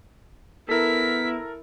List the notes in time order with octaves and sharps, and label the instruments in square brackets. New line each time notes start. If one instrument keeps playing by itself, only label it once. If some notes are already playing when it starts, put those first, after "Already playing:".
[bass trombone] B3 [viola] E4 [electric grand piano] A4 A#4 [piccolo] B6